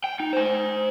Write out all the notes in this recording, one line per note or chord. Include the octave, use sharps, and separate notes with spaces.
G5
D#4
C5 G#5